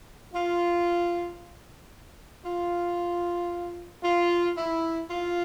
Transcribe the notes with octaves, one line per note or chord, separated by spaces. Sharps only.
F4
F4
F4
E4
F4